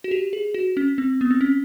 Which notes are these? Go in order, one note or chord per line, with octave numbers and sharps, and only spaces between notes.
F#4
G4
G#4
F#4
C#4
C4
B3
C4
C#4